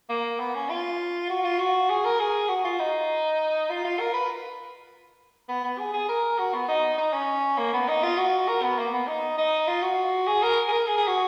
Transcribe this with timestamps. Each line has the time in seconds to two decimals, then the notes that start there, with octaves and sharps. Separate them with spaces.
0.09 A#3
0.39 B3
0.55 C#4
0.70 F4
1.30 F#4
1.44 F4
1.59 F#4
1.90 G#4
2.05 A#4
2.20 G#4
2.49 F#4
2.65 F4
2.79 D#4
3.70 F4
3.85 F4
3.99 A#4
4.13 B4
5.48 B3
5.64 B3
5.79 G#4
5.94 G#4
6.09 A#4
6.38 F#4
6.54 B3
6.68 D#4
6.98 D#4
7.13 C#4
7.58 A#3
7.73 B3
7.88 D#4
8.03 F4
8.17 F#4
8.48 A#4
8.63 B3
8.78 A#3
8.93 B3
9.07 D#4
9.38 D#4
9.67 F4
9.82 F#4
10.27 G#4
10.42 A#4
10.68 G#4
10.72 A#4
10.87 G#4
10.97 G#4
11.07 F#4